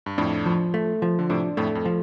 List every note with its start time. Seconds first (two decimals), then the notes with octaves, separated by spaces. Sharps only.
0.06 G2
0.18 F2 A2 D4
0.46 F3
0.74 A3
1.02 F3
1.19 D3
1.30 A2 C3 D4
1.57 F2 A2 A3
1.75 F2
1.85 F3